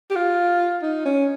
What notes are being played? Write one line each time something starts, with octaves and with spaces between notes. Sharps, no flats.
G4
F4
D#4
C#4